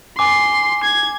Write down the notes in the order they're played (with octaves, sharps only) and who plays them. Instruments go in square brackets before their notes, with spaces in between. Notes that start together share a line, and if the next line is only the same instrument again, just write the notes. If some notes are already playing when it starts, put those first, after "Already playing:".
[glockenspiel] G#5 D6 [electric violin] C6
[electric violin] G#6